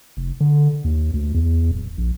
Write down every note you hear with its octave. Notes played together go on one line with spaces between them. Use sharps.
F1
D3
D#2
D2
E2
D1
A#1